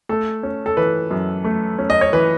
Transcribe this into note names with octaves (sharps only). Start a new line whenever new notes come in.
A3 A4
C#4
A4
E3 B4
F#2
A3
C#4
D#5
C#5
E3 B4